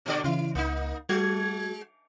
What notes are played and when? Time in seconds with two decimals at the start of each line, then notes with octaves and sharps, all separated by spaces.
0.06 A#2 D3 D5
0.24 C#3 E3 E4
0.55 C#2 A#3 D#4
1.09 G3 G#3 F#4 G#6